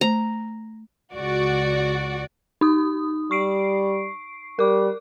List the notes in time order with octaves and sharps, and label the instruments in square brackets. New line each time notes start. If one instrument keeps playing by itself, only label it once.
[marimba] A3 C5 [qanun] A#5
[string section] C#2 F#4 D5
[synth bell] D#4 D#6
[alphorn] G3 [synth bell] C#6 C7 D7
[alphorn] G3 [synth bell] A#4 D6